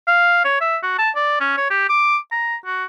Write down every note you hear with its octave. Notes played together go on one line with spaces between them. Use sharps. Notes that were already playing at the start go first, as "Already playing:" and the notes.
F5
C#5
E5
F#4
A5
D5
C#4
C#5
G4
D6
A#5
F#4